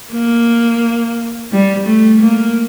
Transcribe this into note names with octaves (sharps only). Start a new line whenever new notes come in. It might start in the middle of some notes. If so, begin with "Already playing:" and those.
A#3
G3
A3
A#3